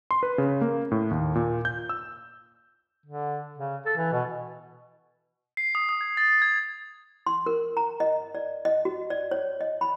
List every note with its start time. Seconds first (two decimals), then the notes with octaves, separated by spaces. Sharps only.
0.11 C6
0.23 B4
0.38 C#3
0.61 A#3
0.92 A2
1.11 D#2
1.35 A#2
1.65 G6
1.89 E6
3.06 D3
3.58 C#3
3.85 A4
3.97 E3
4.12 B2
5.57 C7
5.75 D#6
5.89 D#6
6.01 G#6
6.17 A6
6.42 G#6
7.27 C6
7.46 A#4
7.77 A#5
8.00 D#5
8.35 D5
8.65 D#5
8.85 F#4
9.10 D5
9.31 C#5
9.61 D#5
9.81 B5